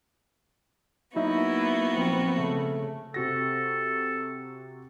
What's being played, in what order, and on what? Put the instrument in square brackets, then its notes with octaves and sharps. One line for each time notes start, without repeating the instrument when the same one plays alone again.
[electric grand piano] F#3 D#4 E5 [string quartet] A#3 B3 F#4 [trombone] E4
[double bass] F3 C4
[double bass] C#3 [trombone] A3
[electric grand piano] C3 F#4 A#6 [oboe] A4